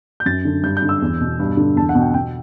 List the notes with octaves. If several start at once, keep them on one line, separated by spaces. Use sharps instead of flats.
G6
F#2 A6
D3
G2 G6
G6
D3
E6
E2
B2
G2
D3
E2 A5
F#5
B2
G5
B2 G5